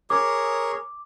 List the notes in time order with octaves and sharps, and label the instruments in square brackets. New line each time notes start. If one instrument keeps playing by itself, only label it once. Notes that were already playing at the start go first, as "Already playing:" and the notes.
[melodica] G#4 A#4 C#5 [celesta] D6